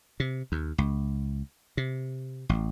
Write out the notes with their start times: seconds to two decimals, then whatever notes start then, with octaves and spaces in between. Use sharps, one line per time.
0.20 C3
0.52 D#2
0.78 C#2
1.77 C3
2.49 A1